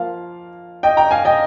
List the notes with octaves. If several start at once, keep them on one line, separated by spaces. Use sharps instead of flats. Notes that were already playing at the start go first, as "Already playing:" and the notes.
Already playing: F3 A#3 F4 F5
D#5 G5
G5 A#5
F5 G#5
D#5 G5